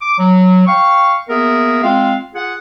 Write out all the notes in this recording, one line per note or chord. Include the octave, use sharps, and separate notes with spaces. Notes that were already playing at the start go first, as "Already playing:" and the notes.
D6
F#3
F5 G5 C#6
A#3 B3 G#4 A#4 E5
G#3 C4 F4 F5
F4 G#4 F#5